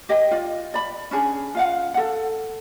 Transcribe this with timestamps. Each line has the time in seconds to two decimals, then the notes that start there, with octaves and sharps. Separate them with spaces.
0.09 G4 D#5 G5
0.31 F4 D5
0.74 D5 B5
1.11 C#4 D4 G#4
1.55 F4 F5 F#5
1.94 A4 F#5